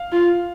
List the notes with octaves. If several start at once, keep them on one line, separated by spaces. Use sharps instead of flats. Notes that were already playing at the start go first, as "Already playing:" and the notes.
Already playing: F5
F4